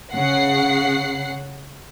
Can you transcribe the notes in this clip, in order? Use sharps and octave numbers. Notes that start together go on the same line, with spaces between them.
C#3 F#5 C7